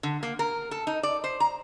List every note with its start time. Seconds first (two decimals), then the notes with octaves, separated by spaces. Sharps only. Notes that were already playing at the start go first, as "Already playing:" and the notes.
0.03 D3
0.23 A#3
0.39 A#4
0.71 A4
0.87 D#4
1.03 D5
1.24 C5
1.40 A#5